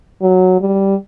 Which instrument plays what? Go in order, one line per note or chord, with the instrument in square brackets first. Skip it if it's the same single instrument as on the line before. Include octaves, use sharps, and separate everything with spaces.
[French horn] F#3
G3